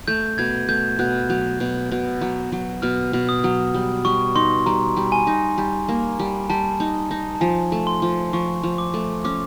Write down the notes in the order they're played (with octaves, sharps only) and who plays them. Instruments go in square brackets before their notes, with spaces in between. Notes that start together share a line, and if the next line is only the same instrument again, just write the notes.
[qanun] A3 [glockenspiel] G6
[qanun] B2 [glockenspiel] G#6
[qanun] A3 [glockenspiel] G6
[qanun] B2 [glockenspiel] F#6
[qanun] F#3
B2
B2
F#3
F#3
[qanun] B2 [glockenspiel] F6
[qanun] B2
[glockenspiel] D#6
[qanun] F#3
G3
[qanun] G3 [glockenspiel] C#6
[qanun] D#4 [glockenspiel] C6
[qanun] G3 [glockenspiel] A#5
[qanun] G3
[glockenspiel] G#5
[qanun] D#4
G3
A#3
G3
[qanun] G3 [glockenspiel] A5
[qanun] D#4
D#4
[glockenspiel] A5
[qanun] F3 [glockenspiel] G#5
[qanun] A3
[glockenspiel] C6
[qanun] F3
[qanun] F3 [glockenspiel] C#6
[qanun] F3
[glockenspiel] D6
[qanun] A3
[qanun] C#4 [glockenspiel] D6